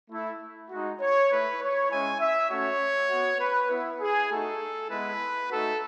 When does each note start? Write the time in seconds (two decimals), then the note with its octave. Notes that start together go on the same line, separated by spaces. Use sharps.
0.10 A3 E4
0.71 G#3 D#4 F#4
1.00 C#5
1.30 A3 E4 B4
1.60 C#5
1.91 G#3 C#4 E4 G#5
2.20 E5
2.51 A3 C#4 F#4 C#5
3.10 B3 F#4
3.40 B4
3.71 B3 E4
4.01 G#4
4.30 A3 D#4 F#4 A4
4.90 G#3 B3 E4 B4
5.50 A3 D#4 F#4 A4